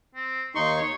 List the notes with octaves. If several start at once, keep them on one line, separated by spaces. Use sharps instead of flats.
C4
D#2 D#4 C6 C#6
C#5